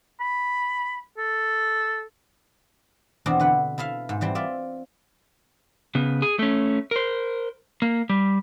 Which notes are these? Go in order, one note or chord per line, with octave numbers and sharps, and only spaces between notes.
B5
A4
E2 B2 C4 D4
D3 B4 F#5
E4 A4 E5 F5
G#2
E3 G3 C4
F4 D5 E5
C#3 B3
G#4
A3 C#4
A#4 C5
A#3
G3